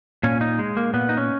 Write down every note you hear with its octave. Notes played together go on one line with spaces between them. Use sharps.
A#2 C#4
D#4
G#3
A#3
A#2 B3
D#4
C#4